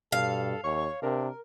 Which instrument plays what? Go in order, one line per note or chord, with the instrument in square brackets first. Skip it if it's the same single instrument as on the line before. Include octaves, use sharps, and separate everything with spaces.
[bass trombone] G2 [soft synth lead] B2 [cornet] A4 [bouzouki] F5
[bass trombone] D#2 [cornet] C#5 [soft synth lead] C#6
[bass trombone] C3 [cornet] D4 [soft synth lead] A#4